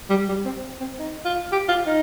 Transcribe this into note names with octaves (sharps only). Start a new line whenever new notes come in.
G3
G3
C4
C4
D#4
F4
G4
F4
D#4